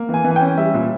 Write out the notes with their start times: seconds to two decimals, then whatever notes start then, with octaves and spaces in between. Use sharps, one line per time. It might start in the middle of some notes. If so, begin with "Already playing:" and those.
Already playing: A#3
0.09 E3 G#5
0.24 E3
0.31 G#5
0.36 G5
0.41 C#4
0.57 G3 E5
0.74 A#2